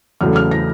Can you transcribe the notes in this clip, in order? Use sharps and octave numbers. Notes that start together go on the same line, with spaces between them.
E2 C#3 F#3 A3 F6
F6
A#6